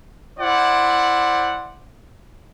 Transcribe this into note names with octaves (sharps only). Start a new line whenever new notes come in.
E4 C5 D5 F#5